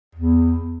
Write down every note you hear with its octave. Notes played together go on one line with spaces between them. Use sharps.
E2